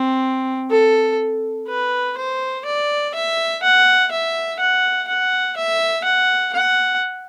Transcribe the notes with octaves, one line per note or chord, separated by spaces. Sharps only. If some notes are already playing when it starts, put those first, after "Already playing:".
Already playing: C4
A4
B4
C5
D5
E5
F#5
E5
F#5
F#5
E5
F#5
F#5